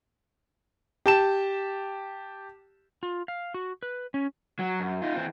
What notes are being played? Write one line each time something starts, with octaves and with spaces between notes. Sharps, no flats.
G4 A5 E7
F4
F5
F#4
B4
C#4
F#3
F#2
D#4 F4
E3 C4